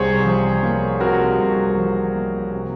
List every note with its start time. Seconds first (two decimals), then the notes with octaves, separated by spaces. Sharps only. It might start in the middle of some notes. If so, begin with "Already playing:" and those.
Already playing: C2 C3 G#4 C5 C#5
0.24 F3
0.63 A#3
1.00 C3 F#4 A#4
1.39 C2
1.76 F3
2.15 A#3
2.53 C3